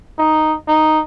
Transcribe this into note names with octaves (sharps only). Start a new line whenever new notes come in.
D#4
D#4